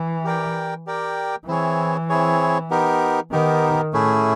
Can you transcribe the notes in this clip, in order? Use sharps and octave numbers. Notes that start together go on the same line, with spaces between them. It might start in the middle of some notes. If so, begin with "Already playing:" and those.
Already playing: E3
G4 A#4 D5 G5
G4 A#4 D5 G5
E3 C4 E4 G#4 C#5
C4 E4 G#4 C#5
B3 D#4 G4 A#4
D#3 B3 D#4 G4 A#4
A2 A3 C#4 E4 G#4